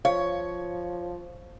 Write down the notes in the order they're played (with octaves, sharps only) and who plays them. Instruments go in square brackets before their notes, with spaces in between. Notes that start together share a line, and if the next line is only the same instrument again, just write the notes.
[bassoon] F3 [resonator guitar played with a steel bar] C#5 [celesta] F5